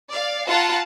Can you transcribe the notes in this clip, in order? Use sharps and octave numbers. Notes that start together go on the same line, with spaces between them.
D5 F5
F4 F#5 A5 A#5